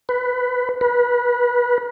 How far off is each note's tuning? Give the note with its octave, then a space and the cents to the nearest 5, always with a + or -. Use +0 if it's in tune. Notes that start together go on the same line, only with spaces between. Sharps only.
B4 +15
B4 -25